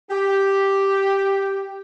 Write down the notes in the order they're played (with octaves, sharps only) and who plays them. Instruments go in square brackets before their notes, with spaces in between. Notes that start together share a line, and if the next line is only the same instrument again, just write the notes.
[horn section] G4